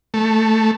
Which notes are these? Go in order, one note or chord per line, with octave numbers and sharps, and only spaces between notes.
A3